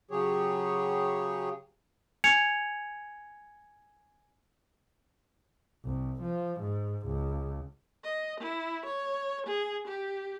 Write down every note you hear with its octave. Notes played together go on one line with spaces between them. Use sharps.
C#3 F#3 G4 G#4 C#5
G#5 G#6 C#7 F7
C2
F3
G#2
C#2
D#5
E4
C#5
G#4
G4